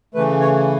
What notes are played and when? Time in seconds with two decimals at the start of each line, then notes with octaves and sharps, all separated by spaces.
0.14 C#3 E3 A3 B4
0.41 C#5